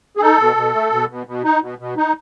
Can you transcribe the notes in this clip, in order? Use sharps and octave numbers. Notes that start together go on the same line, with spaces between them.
G#4
D#4 A4
B2
B2
A3
B2
B2
B2
D#4
B2
B2
D#4